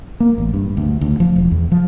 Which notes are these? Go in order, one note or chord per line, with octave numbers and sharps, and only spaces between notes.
A#3
A1
G2
D2
D2
F3
E1
E2
F3